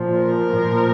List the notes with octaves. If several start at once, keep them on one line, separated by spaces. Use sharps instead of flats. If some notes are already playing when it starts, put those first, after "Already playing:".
Already playing: A#2 F3
A#4
A#2 F3